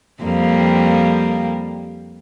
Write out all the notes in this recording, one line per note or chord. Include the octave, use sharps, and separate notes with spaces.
F2 G3 A#3